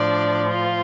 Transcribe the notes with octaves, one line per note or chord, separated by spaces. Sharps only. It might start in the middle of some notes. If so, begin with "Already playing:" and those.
Already playing: A2 F3 D4 D5
F4